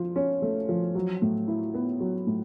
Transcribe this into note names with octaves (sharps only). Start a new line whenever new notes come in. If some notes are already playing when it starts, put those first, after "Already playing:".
Already playing: F3 F4
C#4
A3
F3
F#3
A2
E4
B3
F#3
A2